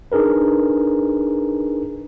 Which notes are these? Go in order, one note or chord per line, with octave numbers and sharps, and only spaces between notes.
D4 D#4 G#4 A#4 B4